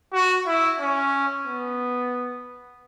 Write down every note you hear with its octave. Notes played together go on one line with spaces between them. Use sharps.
F#4
E4
C#4
B3